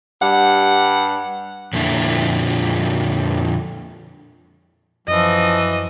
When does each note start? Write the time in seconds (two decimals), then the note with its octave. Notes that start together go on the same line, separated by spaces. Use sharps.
0.20 G2 G3 F#5
1.73 F2 A#2 D3 E4
5.08 F#2 E3 F3 D#5